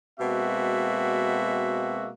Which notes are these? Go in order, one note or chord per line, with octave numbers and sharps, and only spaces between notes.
B2 G#3 A#3 C4 F#4 E5